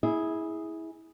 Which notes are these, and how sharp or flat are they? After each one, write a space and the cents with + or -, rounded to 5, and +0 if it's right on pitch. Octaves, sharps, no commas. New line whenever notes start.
E4 -20 G#4 +0